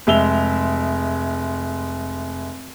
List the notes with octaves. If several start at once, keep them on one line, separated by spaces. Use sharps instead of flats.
F1 G#3 E5 F7 G7